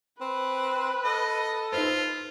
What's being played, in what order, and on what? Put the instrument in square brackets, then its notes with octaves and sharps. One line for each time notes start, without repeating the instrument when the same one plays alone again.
[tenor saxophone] C4 [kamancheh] B4
[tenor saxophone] A4 [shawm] D#5
[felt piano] D#4 B4 C5 [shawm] F4